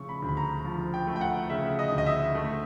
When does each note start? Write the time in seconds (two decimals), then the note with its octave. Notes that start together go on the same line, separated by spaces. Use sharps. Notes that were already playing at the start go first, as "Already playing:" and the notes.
Already playing: C#3 F3 A3 C#6
0.09 B5
0.22 D2
0.29 B5
0.37 A#5
0.65 F3
0.94 G5
1.07 A3
1.16 G5
1.21 F#5
1.50 C#3 E5
1.79 D#5
1.92 D2
1.98 D#5
2.06 E5
2.35 A3